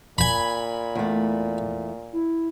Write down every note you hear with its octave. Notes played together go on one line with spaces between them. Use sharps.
A#2 G#5 B5
E2 A3
E4